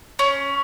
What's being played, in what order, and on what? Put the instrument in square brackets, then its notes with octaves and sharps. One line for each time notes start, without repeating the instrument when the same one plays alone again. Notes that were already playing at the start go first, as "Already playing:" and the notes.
[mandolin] C#4